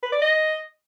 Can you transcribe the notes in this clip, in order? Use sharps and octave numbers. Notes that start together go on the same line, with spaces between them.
B4
D5
D#5